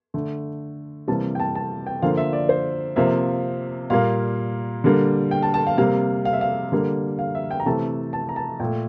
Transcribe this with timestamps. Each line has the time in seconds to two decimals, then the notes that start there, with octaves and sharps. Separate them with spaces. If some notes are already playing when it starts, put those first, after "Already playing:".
0.14 D3 A3
1.08 C3 E3 G3 A#3 A5
1.35 G5
1.40 A5
1.55 A5
1.87 G5
2.02 D3 F3 A#3 F5
2.17 E5
2.33 D5
2.49 C5
2.96 C3 F3 A#3 E5
3.90 A#2 G3 A#3 F5
4.84 D3 G3 A#3
5.31 G5
5.43 A5
5.54 A5
5.67 F5
5.78 C3 G3 A#3 F5
6.25 F5
6.33 E5
6.41 F5
6.72 D3 G3 A#3
7.19 F5
7.35 E5
7.51 G5
7.60 A#5
7.66 C3 E3 A3 A5
8.13 A5
8.29 A#5
8.36 A5
8.60 A#2 A3 G5